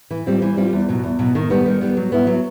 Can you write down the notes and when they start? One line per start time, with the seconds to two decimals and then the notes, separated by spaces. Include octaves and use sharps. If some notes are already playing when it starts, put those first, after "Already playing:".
0.11 E3
0.26 G3 C4 F4
0.42 E3
0.57 G3 C4 F4
0.73 E2
0.89 B2 F#3
1.04 E2
1.19 B2 F#3
1.35 D#3
1.50 G3 B3
1.66 D#3
1.81 G3 B3
1.97 F#3
2.12 B3 E4
2.27 F#3